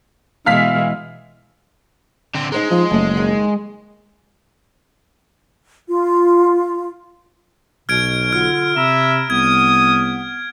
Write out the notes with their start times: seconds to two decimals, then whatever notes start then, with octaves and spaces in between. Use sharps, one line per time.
0.46 B2 E3 G#3 F5 F6 B6
2.35 D3 C4
2.52 G#3 D#4 C5 A#5
2.71 F3 D#4
2.91 F#1 A3
3.15 D#2 D#3
5.89 F4
7.89 B1 B2 F6 G#6 D7
8.33 D3 F4 F6
8.76 C3 E5 A#5 B5 E6
9.30 C2 B3 D#6 G#6